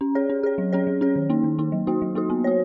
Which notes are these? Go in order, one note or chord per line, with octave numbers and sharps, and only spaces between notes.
C#4
G#4 C#5
C#4
G#4 C#5
F#3
C#4 G#4 C#5
F#3
C#4 G#4 C#5
D#3
A#3 D#4
D#3
A#3 D#4
F#3
A#3 D#4 F#4
F#3
A#3 D#4 F#4
B3
F#4 C#5